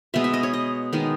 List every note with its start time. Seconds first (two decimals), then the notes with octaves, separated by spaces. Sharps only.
0.14 B2 G#3 B3 E5
0.24 E5
0.34 D#5
0.43 C#5
0.53 D#5
0.93 D#3 G#3 B3